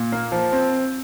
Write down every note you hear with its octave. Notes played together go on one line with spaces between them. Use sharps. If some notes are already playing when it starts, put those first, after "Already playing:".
Already playing: A#2
A#3
F3
C4